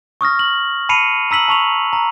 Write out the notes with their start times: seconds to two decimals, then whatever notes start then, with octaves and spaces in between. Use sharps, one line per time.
0.21 C#6 D#6 F6 A#6
0.39 F#7
0.89 A5 B5 C7 C#7 D#7 F7
1.31 A#5 E6 B6 F#7
1.48 A5 C#6 F7
1.93 A#5